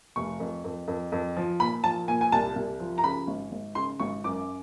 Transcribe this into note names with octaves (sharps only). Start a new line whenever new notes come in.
F1 C#6
F2
F2
F2
F2
F3
A#2 B5
F3 A5
A#2 G#5
G#5
C2 A5
C2
F3
A#5
C#3 B5
G#1
G#1
C#3 C6
G#1 C#6
F#2 D6